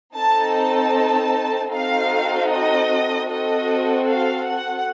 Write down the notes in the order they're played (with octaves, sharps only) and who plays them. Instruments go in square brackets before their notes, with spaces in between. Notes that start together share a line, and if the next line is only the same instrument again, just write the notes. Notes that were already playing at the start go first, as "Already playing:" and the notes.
[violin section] C4 D#4 A4 A5
A5
C4 D#4 F#4 A4 F5
D#5
C4 F#4 A4 D#5
F5
F#5